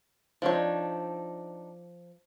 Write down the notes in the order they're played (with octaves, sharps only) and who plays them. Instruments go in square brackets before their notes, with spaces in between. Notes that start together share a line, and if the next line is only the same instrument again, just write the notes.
[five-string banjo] F3 C#5 [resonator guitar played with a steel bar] C4 D4 D#4